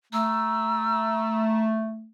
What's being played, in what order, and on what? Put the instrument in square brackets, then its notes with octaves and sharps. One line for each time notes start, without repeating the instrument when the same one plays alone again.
[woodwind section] A3 [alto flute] A#5 [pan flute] E6